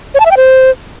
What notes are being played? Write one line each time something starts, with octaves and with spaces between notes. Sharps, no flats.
C#5
A5
E5
G5
C5